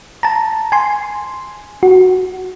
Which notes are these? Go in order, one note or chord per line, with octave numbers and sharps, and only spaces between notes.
A5 A#5
G#5 C6
F#4